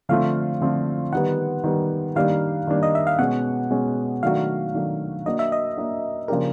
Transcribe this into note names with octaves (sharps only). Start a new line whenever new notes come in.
D3 F3 A3 C4 F4 F5
D3 F3 A3 C4 F4
D#3 G3 B3 F#5
D#3 G3 B3
D#3 G3 A#3 D4 F5
D#3 G3 A#3 D4
D#5
E5
F5
B2 G#3 C#4 F#5
B2 G#3 C#4
D#3 F#3 A3 D4 F#4 F5
D#3 F#3 A3 D4 F#4
A#3 D4 F#4 D#5
E5
D#5
A#3 D4 F#4
C#3 F3 A#3 D4 G4 A#4